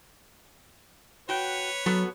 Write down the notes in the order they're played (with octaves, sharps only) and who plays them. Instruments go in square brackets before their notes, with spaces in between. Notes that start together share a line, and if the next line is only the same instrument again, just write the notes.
[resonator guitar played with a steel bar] F#4 G5 [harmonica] B4 C#5
[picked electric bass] F#3 [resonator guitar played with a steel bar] B3 F#4 A4